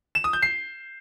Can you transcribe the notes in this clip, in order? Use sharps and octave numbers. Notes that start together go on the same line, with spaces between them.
E7
D#6
G6
C7